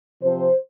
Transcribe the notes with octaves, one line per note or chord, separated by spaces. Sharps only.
C3 F3 C4 C5